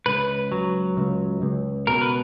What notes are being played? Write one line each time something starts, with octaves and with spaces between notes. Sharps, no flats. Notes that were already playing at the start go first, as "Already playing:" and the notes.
C#2 B4
F#3
C#2
C#2
B2 A#4
B4